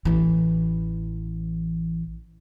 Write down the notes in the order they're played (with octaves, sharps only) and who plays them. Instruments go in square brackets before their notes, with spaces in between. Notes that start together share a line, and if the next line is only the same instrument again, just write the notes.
[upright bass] A1 E3